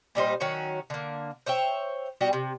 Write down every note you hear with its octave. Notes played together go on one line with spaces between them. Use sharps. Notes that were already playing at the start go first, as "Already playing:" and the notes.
A#2 G3 D#4 C5
D#3 F#3 C#4 F#4
D3 A#3
C5 C#5 E5 G5
G3 B3 F#4 G4
C3